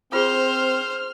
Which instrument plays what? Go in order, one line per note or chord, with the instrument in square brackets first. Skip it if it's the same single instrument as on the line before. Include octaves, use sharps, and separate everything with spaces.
[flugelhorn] C4 [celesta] F4 G#4 G7 [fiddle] C5 [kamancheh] F6